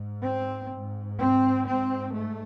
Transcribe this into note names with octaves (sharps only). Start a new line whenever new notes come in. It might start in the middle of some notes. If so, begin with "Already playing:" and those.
Already playing: G#2
C4
G#2
C4
G#2 C4
A3